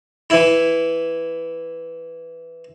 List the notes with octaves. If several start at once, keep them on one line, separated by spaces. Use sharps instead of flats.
E3 E4